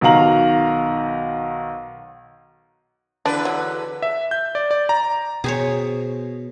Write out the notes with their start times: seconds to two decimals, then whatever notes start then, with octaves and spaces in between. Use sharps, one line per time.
0.01 B1 D#3 F#4 F5 A#5 F#7
3.26 E2 D3 D4 B4
3.45 F#3
4.02 E5
4.31 G6
4.55 D5
4.71 D5
4.89 A#5
5.44 B2 G#4 C5 C#5